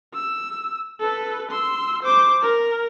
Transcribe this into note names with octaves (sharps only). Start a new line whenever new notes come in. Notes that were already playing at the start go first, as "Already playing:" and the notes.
E6
A4 B4
C6 E6
C5 D6
A#4